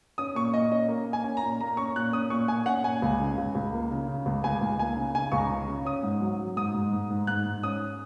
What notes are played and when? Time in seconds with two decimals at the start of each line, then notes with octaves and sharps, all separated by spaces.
0.18 C#4 D#6
0.35 A#2 C#6
0.54 A#2 D#5
0.71 C#4 D#5
0.88 A#3
1.06 A#3
1.13 G#5
1.24 C#4
1.37 A#5
1.42 A#2
1.61 A#3 A#5
1.77 C#4 C#6
1.96 A#2 F#6
2.13 C#4 D#6
2.30 A#2 C#6
2.48 A#2 G#5
2.66 C#4 F#5
2.84 A#2 G#5
3.02 C#2
3.20 C#3
3.38 C#2
3.55 C#2
3.72 A#3
3.91 C#3
4.08 C#3
4.26 C#2
4.44 C#2 G#5
4.61 C#2
4.79 A#3 G#5
4.97 C#3
5.15 C#3 G#5
5.32 C#2 C#6
5.38 A#5
5.50 C#3
5.68 C#3
5.85 C#4 D#6
6.03 G#2
6.21 F#3
6.40 F#3
6.57 G#2 D#6
6.74 G#2
6.93 G#2
7.10 G#2
7.27 G#2 F#6
7.46 G#2
7.63 C#4 D#6